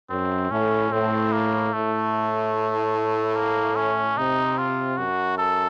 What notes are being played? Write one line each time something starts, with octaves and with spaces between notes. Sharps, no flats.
F#2 C4
A2 C#4
A2 C4
A#3
A2 A3
A#3
C#4
C3 D#4
F4
F#2 F#4
A4